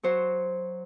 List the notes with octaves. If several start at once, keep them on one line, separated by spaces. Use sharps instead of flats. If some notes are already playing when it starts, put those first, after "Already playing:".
F#3 F#4 C5